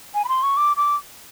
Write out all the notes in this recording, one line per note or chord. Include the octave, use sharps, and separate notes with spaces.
G#5
B5
C6
C#6
D6
D6